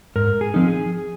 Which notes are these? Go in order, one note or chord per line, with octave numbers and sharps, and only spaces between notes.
G#2 A#4
G#4
F3 C4 D#4
G#4